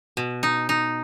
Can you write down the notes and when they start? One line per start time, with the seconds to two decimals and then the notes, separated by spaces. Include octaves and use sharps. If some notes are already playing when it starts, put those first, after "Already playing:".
0.17 B2
0.43 D#4
0.69 D#4